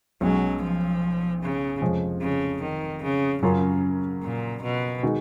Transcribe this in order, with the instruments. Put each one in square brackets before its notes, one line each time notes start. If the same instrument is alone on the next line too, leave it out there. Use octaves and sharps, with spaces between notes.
[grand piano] B1 B2 G#3 C#4 [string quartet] F#3
[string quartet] F3
C#3
[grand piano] F1 F2 F3 G#3 C#4
[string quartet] C#3
D#3
C#3
[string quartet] F#2 [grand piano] C#3 F#3 C#4 F4 A#4
[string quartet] A#2
B2
[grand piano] D#3 G#3 D#4 F#4